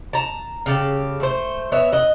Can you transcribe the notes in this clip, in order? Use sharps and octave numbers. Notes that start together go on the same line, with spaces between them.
A5 A#5
C#3 G4 A4
A3 C5
B3 C#5 E5
D#5 F#5